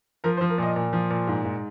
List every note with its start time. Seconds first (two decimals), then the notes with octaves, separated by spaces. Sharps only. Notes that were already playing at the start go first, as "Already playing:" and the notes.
0.24 F3 A#4
0.37 C5
0.41 F3
0.49 A#4
0.58 A#2 D#5
0.76 A#2
0.93 F3
1.10 A#2
1.27 G#2
1.44 G#2